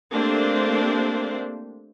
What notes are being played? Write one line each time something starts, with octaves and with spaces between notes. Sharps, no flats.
A3 A#3 C4 D4 G4 C5